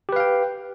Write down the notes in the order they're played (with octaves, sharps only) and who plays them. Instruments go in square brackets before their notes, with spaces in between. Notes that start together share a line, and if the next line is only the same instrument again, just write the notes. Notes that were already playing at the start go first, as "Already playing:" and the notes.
[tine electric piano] G4
B4
F5
G5